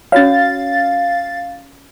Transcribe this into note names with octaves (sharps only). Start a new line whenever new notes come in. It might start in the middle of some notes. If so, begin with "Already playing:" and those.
C#4 F#4 C#5 F5 A6